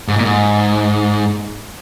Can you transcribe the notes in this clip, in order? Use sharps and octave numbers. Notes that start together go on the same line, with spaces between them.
G#2
A#2
G#2